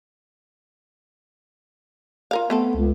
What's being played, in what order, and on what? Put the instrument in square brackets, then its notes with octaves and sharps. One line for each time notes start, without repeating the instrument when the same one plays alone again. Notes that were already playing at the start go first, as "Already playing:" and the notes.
[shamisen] F4 A#4 F5
[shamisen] A3 C4 A4 [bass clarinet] B3
[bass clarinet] C#2